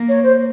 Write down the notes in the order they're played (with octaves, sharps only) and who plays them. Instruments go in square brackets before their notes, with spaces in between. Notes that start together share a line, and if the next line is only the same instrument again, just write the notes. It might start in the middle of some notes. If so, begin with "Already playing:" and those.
Already playing: [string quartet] A#3
[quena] C#5
C5